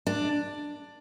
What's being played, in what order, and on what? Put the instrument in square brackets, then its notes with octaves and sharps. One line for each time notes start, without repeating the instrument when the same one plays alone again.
[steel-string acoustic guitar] D4